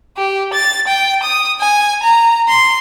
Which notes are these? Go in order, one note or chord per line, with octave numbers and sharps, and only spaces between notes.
G4
A6
G5
D#6
G#5
A#5
C6